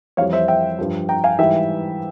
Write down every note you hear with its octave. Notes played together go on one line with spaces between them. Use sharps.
F2 E3 G3 C#5 F5
C5 E5
E5 G5
G2 F3
G5 A#5
F5 G#5
G#2 E3 G3 E5 G5